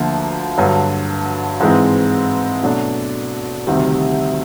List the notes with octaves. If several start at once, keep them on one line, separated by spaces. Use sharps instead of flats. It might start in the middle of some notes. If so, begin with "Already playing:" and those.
Already playing: D2 D3 F3 A#3
G2 D3 F#3
G#2 E3 G#3 C4
B2 F#3 A3 D4
D2 C3 D#3 G3 C4